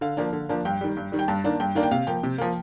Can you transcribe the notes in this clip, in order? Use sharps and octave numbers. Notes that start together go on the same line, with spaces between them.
D3 F5
F3 A#3 D4
D3
F3 A#3 D4
G2 G5
D#3 G3
G2
D#3 G3
G5
G2 A5
D#3 A#3 D4
G2 G5
D#3 A#3 D4
G5
C3 F5
F3 A#3 G5
C3
F3 A#3